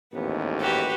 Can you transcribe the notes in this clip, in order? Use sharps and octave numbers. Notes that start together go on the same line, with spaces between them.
A1 D#2 G#2 B3
F#4 G4 B4